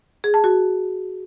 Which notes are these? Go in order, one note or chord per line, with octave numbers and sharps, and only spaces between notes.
G#4
A5
F#4